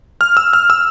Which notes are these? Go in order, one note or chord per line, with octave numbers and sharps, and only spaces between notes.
F6
E6
F6
E6